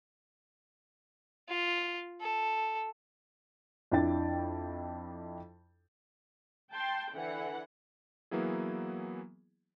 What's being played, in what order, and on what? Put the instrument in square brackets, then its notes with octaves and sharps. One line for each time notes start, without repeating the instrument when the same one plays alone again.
[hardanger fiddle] F4
A4
[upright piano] F2 D4 E4 G5 A6
[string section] G5 A5 C6
D3 E3 F#5
[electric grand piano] E3 F#3 A#3 B3 E4 G#4